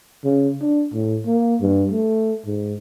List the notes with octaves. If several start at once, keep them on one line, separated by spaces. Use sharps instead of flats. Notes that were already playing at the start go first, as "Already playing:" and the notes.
C#3
D4
A2
A#3
G2
A3
G#2